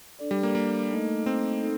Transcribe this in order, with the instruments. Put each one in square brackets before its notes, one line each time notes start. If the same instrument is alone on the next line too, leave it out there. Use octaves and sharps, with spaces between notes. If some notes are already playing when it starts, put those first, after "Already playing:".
[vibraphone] D4 A4 D5
[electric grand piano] G3
A#3
A#3
[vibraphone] A3 D#4 A4 D#5
[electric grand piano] C4
[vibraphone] D#4 A4